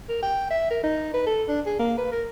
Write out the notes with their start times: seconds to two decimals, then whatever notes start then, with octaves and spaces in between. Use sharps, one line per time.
0.09 A#4
0.23 G5
0.51 E5
0.71 A#4
0.83 D#4
1.14 B4
1.27 A4
1.49 D4
1.66 G#4
1.79 A#3
1.98 B4
2.12 A#4